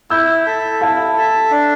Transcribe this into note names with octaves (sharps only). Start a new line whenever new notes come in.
E4 E6 G6
A4 E5
E4 F5 A5
A4 E5
D4